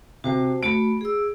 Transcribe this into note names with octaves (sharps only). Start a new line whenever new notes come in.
C3 F#4 C5 A5
A3 F#4 B5 D7
G#4 E6